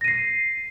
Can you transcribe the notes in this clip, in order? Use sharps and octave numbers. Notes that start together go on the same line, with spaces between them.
A#6 C7 D#7